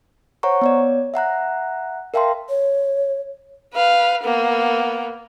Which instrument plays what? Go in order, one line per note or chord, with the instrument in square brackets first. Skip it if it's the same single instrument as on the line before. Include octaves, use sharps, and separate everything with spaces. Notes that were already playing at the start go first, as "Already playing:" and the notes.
[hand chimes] C5 C#5 F#5 A#5 C#6
B3 C#5 D5
E5 F#5 A#5 F#6
A#4 E5 F5 G5 A5 C6
[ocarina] C#5
[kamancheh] B4 F5
A#3 B3